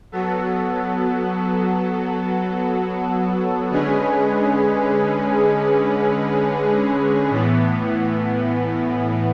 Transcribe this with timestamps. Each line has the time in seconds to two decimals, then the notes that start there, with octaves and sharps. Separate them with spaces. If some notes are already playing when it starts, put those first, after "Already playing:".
0.12 F#3 B3 F#4 A4
3.71 D3 G#3 C#4 G#4 B4
7.30 A2 E3 B3